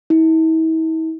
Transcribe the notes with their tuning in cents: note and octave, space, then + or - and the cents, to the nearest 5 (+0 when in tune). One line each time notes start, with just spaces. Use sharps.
E4 -40